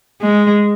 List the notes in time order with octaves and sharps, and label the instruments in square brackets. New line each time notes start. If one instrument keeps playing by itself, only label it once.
[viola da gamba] G#3